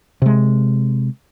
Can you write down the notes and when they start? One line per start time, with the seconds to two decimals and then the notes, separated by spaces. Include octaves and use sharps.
0.22 C3 G#3